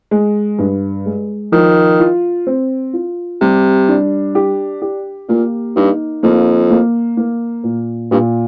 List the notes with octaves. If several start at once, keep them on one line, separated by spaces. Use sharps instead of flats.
G#3
G2
G#3
D#3 F3
F4
C4
F4
C3 G3
D4
G4
G4
A#2 A#3
G2 D#4
F2 A#3
A#3
A#3
A#2
G2 A#2